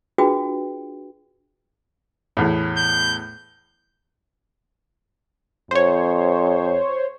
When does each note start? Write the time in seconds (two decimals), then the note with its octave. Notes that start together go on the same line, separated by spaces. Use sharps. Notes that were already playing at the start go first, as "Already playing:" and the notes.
0.18 D4 F4 F#4 G#4 B4 G5
2.37 E2 A2
2.77 G6
5.71 F2 C5 C#5